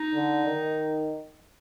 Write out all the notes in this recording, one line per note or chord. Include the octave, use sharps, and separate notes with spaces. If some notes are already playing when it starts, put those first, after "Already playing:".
Already playing: D#4
D3
D#3